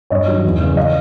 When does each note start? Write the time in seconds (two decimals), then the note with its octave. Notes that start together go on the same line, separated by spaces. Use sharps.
0.10 G2 C#5 D#5
0.28 D#3 F#3
0.45 E2
0.61 C#3 E3
0.77 D#5 F5